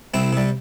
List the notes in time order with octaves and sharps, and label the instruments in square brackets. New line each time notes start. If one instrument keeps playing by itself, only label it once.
[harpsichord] C2 C4 E4
C3 G3